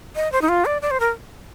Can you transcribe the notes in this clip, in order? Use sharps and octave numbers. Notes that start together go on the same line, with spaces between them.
D#5
C5
D#4
F4
D5
D5
C5
A#4